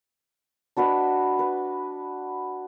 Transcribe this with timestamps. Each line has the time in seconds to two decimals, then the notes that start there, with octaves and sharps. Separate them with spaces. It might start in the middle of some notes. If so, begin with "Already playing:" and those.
0.77 D4 F#4 B4 D#5
1.39 B4